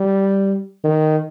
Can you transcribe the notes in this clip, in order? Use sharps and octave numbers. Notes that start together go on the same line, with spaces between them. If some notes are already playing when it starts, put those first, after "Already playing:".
Already playing: G3
D#3